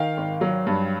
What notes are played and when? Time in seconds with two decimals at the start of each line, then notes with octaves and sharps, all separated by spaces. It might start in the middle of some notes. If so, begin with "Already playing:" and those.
Already playing: D#3 F5 G5
0.17 G#1
0.41 F#3
0.67 G2